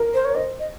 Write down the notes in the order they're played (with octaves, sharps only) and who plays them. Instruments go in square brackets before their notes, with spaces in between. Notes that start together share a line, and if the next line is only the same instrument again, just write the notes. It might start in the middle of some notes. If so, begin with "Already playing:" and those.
Already playing: [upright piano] A#4
[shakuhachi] C5
C#5
[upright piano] C5 [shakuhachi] D#5
[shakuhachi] D#5